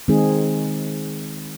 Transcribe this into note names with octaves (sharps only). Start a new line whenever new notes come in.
D#3 G#3 C4 D#4 G#4